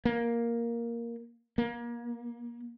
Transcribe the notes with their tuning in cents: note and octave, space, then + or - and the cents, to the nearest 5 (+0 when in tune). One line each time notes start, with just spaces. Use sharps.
A#3 +5
A#3 +30